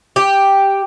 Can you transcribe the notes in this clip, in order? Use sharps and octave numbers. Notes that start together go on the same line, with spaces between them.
G4